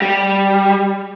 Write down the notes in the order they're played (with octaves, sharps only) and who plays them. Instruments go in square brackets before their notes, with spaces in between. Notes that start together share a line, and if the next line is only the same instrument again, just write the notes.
[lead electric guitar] G3